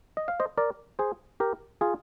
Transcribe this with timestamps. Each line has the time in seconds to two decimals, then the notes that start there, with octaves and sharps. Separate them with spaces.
0.17 D#5
0.28 F5
0.40 C5 D#5
0.58 A#4 D5
0.99 G#4 C5
1.40 G4 A#4
1.81 F4 G#4